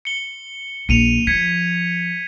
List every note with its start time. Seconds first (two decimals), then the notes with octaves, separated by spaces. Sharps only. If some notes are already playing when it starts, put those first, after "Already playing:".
0.05 C#7 G7
0.89 A#1 C#7 D#7 F7
1.27 F3 G#6 B6 C#7